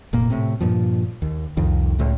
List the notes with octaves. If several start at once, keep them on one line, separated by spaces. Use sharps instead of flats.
F1 A#2 A#3
A2 C3
G2 A#2 F3
D#2
C2 F2 D#3
C#2 A2